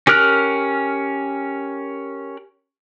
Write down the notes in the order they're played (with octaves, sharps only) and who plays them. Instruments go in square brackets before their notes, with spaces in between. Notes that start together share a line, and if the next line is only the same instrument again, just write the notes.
[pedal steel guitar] C#4 G4 A#4 F6 F#6